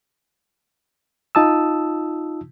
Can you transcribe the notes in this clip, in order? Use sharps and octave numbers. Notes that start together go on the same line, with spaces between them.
D#4 F4 A5 D#6 E6